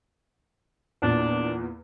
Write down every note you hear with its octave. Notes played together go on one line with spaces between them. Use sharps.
E2 A#2 D4